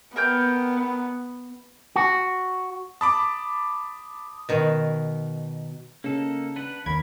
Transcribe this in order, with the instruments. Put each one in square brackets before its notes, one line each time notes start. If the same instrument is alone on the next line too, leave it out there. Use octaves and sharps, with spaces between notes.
[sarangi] B3 [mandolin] A#4 G5 G6
[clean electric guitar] F#4
[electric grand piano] A5 B5 D6 [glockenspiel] D#6
[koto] B2 D#3
[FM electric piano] C#3 [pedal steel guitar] A#3 D#4 A4
[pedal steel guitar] D4 B4 F#5
[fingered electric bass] D#2 [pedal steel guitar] A#4 [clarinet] B5 [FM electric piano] G#6